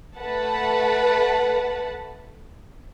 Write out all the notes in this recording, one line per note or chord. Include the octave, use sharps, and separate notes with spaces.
A3 B4 F#5 A5